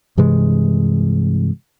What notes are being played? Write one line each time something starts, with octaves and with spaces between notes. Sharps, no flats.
G2 C3 E3 G#3